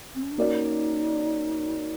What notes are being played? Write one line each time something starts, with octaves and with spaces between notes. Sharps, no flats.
C4
C#4
D4
A#3 C#4 D#4 F#4 A#4 D5